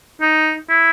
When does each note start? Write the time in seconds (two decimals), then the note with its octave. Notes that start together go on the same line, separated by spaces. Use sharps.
0.22 D#4
0.69 E4